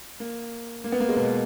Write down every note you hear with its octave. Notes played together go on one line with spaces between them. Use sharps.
A#3
A#3
B3
A#3
G#3
B2